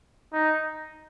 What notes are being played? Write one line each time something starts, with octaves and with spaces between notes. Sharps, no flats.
D#4